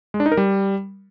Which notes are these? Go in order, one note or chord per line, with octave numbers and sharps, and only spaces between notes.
G#3
D4
D#4
A#4
G3